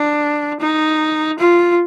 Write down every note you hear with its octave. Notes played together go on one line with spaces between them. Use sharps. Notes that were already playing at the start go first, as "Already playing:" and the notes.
Already playing: D4
D#4
F4